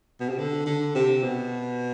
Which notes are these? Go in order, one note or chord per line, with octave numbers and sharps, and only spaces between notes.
B2
C3
D3
D3
C3
B2